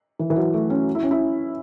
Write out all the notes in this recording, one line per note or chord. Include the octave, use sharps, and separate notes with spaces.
E3
E3
F#3
A3
C#4
E4
C#4
E4